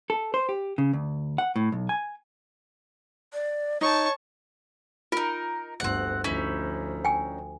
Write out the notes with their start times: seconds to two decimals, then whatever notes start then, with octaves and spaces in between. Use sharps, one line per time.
0.10 A4
0.34 C5
0.49 G4
0.78 C#3
0.93 D2
1.38 F#5
1.56 A2
1.72 B1
1.89 G#5
3.33 D5
3.81 D#4 C#5 A5 C#6
5.12 D#4 F4 A#4
5.80 G1 D2 C4 F#5
6.24 D2 F3 C#4 D#4 E4
7.05 G5 G#5